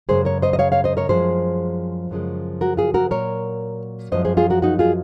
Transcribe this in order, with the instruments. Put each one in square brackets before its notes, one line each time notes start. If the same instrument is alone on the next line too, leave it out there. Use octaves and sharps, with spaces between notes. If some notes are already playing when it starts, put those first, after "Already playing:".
[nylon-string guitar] F#2 C#3 G#3 G#4 C5
A#4 C#5
C5 D#5
D#5
C#5 F5
C#5 F5
C5 D#5
A#4 C#5
F#2 F3 G#3 G#4 C5
F#2 C#3 F3 G#3
F#4 A#4
F4 G#4
F#4 A#4
A#2 F#3 A#4 C#5
F#2 F3 G#3 C5 D#5
G#4 C5
F4 G#4
F#4 A#4
D#4 F#4
F4 G#4